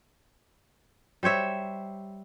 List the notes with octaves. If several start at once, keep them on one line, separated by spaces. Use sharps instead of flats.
G3 C5 C#5 E5